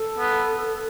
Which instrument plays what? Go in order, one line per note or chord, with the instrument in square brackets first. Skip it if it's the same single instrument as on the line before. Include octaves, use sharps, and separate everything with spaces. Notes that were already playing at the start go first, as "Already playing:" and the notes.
Already playing: [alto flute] A4
[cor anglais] B3